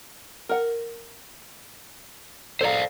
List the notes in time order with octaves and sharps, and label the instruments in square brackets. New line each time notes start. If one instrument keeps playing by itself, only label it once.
[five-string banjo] A#4 F#5
[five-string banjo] A4 A#5 [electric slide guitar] C5 D5 F5